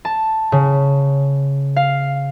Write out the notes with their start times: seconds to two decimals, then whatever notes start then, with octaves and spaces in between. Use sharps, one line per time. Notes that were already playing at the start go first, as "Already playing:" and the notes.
0.05 A5
0.52 C#3
1.76 F5